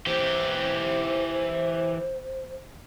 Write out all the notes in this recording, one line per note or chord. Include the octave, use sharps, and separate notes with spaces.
E3 G4 C5